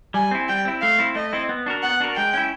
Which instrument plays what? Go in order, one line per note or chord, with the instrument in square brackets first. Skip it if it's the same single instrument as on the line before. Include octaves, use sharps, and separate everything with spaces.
[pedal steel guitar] G3 [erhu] G#5
[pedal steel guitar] C4 E4
[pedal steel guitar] G3 [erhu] G5
[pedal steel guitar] C4 E4
[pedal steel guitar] A3 [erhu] F5
[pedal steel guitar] C4 E4
[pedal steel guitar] A3 [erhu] D#5
[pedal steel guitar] C4 E4
B3
D4 F#4 A#4
[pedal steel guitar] B3 [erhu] F#5
[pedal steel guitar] D4 F#4 A#4
[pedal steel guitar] G#3 [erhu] G5
[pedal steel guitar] C#4 E4